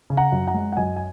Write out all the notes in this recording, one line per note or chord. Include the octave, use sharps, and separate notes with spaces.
C#3
F#5 A#5
F#2
F#5 A#5
G#3
F#5
F#2 D#5 G#5
G#5